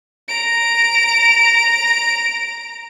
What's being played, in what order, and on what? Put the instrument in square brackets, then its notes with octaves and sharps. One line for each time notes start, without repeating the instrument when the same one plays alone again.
[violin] A#5 D7